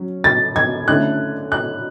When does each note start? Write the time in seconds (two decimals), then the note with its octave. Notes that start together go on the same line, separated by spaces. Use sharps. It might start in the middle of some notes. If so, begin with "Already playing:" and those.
Already playing: F#3 C#4
0.24 A6
0.56 G#6
0.88 D3 A3 C#4 E4 F#6
1.52 F#6